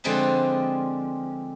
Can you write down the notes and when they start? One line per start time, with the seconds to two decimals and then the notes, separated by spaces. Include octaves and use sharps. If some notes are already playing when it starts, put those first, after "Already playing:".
0.04 D3 F3 G#3 C4 G#4 B4